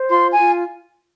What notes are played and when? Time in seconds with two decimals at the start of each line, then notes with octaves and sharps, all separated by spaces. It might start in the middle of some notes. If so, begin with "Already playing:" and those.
Already playing: C5
0.09 F4 C6
0.32 G#5
0.39 F4